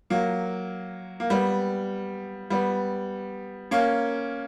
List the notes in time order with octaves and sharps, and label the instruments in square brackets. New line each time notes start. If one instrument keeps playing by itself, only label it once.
[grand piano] F#3 A#3
A#3
G3 B3
G3 B3
A#3 C#4